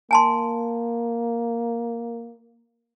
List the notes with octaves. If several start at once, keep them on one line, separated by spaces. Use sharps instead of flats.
A#3 G#5 A5 C6